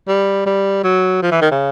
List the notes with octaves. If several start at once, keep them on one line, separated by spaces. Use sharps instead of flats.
G3
G3
F#3
F3
E3
D#3
C#3